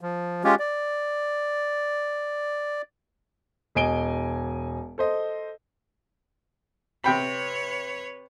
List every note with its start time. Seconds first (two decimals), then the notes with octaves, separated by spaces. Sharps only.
0.01 F3
0.44 G#3 C#4 F4 G4
0.59 D5
3.75 E1 D#5 G#5 D7 G7
4.98 A4 C5 D#5
7.04 C3 B4 C#5 G5 B5